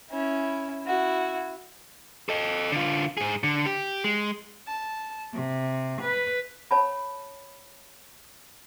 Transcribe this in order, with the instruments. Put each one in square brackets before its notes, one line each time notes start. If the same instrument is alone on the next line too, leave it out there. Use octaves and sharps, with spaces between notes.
[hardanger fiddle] C#4 E4
E4 F#4
[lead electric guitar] A4 D#5
D3 F4
G#2 G#4
D3
G4
G#3
[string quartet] A5
C3
B4
[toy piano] C#5 A5 B5